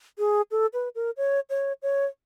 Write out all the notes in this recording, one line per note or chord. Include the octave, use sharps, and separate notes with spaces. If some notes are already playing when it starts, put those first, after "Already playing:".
G#4
A4
B4
A#4
C#5
C#5
C#5